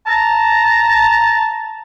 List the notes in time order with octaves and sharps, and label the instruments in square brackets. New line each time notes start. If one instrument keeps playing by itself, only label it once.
[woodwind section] A5 A#5